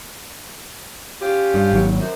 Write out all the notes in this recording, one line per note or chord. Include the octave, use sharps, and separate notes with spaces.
C#4 F4 G4
G2
G#1 F#3
F#2 C5